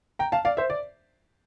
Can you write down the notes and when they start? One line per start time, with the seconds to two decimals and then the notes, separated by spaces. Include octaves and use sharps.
0.19 G5 A#5
0.32 F5 A5
0.45 D5 F5
0.57 C5 E5
0.70 D5